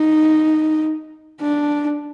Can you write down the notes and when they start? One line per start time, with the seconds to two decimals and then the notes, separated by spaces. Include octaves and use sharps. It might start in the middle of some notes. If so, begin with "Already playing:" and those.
Already playing: D#4
1.41 D4